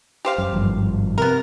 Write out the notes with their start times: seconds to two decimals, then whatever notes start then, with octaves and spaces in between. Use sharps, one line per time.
0.25 G4 C5 F5
0.38 F#2
0.53 G#1 G2 F3
1.18 C3 B3 A#4